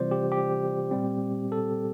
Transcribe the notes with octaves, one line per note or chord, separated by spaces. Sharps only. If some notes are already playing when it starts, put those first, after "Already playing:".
Already playing: C3 E3 G3 C4 F4 C5 D5
G4
G4
A#2 G3 C4
A4